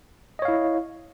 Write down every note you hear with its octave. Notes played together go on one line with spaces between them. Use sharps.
E4 C#5 D#5 F5